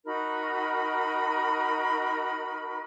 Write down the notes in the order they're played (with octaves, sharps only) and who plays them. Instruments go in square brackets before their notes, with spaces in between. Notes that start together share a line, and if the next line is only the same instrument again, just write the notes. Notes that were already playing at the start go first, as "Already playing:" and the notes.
[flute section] D#4 F#4 A#4 B5